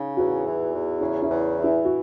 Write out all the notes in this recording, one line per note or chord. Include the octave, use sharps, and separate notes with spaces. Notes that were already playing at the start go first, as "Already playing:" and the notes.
Already playing: C#3 D#4
E2 F#4
E3
E2
C#3 E4
E4
E2
E3
E4
F#4